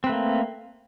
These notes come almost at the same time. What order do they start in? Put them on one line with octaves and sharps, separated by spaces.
C4 B4 A3 A#3